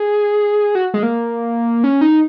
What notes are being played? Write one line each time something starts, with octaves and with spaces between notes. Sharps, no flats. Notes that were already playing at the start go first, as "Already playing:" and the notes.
Already playing: G#4
F#4
G#3
A#3
C#4
D#4